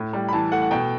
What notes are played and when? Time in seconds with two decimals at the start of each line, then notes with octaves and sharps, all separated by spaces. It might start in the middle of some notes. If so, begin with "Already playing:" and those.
Already playing: A2
0.13 G3
0.29 B5
0.32 E3 A5
0.52 A3 F#5
0.62 F#5
0.71 B2 G5